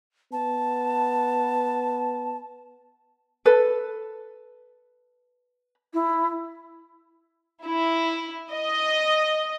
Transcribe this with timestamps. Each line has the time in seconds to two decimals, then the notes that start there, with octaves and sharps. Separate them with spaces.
0.32 B3 A5
3.46 A4 B4
5.94 E4
7.65 E4
8.53 D#5